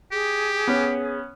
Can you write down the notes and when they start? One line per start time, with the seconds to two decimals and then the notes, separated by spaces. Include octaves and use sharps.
0.12 G4 G#4
0.67 B3 C#4